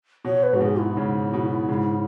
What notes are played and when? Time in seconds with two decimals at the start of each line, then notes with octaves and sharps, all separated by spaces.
0.25 B2 C#5
0.43 B4
0.53 G#2 F#4
0.60 B2 G#4
0.79 E4
0.97 G#2 C#3
1.33 B2
1.69 G#2 C#3